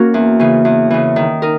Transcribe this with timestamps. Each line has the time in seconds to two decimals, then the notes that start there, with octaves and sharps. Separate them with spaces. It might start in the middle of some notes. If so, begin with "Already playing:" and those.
Already playing: A#3 C#4 F#4 A#4
0.14 E2
0.40 C#3 E3
0.65 E2
0.90 C#3 E3
1.16 D#3
1.42 D#4 A#4